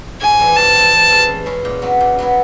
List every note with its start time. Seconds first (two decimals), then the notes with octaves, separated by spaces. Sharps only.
0.21 G#2 G#5
0.39 E3 G3 C4
0.57 G#2 A5
0.74 E3 G3 C4
0.92 E3
1.10 G#3 C#4 E4
1.29 E3
1.46 G#3 C#4 E4
1.65 A#2
1.82 F#3 B3 E4
2.01 A#2
2.19 F#3 B3 E4